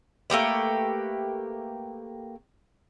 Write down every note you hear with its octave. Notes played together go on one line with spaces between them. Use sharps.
A3 A#3 G4 B4